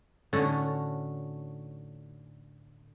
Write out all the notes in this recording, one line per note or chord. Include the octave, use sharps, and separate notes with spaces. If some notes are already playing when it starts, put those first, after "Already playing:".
A2 D3 C#4 D#4 F#4 A4